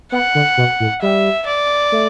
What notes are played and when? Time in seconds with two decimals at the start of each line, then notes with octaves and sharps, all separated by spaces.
0.12 B3 F#5
0.35 D3
0.57 B2
0.80 A2
1.02 G3 E5
1.47 D5
1.92 A3